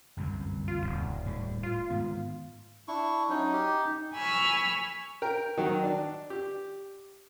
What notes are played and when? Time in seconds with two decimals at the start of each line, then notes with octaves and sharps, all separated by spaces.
0.17 G1 C2 F#2
0.68 F4
0.83 D#1
1.26 A2 G3
1.63 F4
1.90 G#2 D#3 B3
2.88 D4 E4 C#6
3.29 F#3 C#4 D#4
3.53 G4
4.14 G#5 B5 C#6 E6 F6
5.22 A#4 G5
5.58 D#3 F#3
5.84 D4
6.30 G4